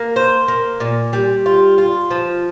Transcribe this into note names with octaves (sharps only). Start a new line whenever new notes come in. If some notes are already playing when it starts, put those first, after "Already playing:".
Already playing: A#3 A#4
C5
A#3
A#2
G3
F4
F4
F3